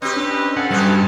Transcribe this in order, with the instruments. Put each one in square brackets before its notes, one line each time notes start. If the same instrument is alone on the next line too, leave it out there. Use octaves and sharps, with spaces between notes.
[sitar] C4 G4 [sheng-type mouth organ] B4 D#5
[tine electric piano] C#4 D4
[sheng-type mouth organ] A4 F5 G#5 [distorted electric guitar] F#5
[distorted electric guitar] G2 [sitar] B2 G#3 G4